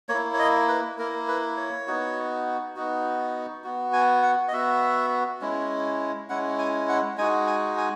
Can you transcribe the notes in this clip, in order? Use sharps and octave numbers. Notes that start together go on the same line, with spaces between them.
A#3 C#5
E4
C#5
D#5
B4
A#3 E4 A#4
B4
C#5
B3 D#4 F#4
B3 D#4 F#4
B3 F#4
G#5
F#5
D#5
B3 F#4 E5
G#3 C#4 E4
G#3 C#4 E4 F#5
G#5
F#5
G#3 D#4 F#4 G#5
G#5
G#5